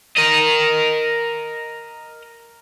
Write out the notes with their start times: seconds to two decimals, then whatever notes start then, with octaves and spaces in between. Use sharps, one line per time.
0.17 A#4 D#5